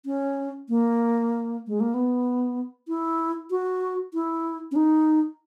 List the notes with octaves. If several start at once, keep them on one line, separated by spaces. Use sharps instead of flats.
C#4
A#3
G#3
A#3
B3
E4
F#4
E4
C#4
D#4